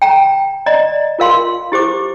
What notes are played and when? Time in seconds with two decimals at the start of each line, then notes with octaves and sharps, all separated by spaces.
0.02 G5 A#5
0.66 D5 D#5 A#5
1.19 F4 A#4 F5 C6
1.72 E4 G4 C5 D6